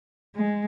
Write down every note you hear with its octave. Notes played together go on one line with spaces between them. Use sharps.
G#3